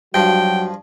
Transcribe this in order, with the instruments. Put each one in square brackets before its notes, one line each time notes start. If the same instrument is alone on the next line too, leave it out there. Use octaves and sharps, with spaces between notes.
[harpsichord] G2 F3 [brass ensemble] F#3 F#4 [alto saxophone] G5